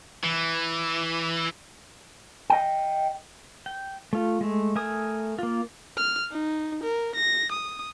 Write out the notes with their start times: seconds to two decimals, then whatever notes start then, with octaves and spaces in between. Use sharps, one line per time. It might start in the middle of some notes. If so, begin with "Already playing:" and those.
0.23 E3
2.50 D#5 G5
3.66 G5
4.13 A3 F4
4.41 G#3 A3
4.76 A3 A#4 G#5 D#6
5.39 A#3 F4
5.97 F6
6.31 D#4
6.83 A#4
7.16 A#6
7.52 D#6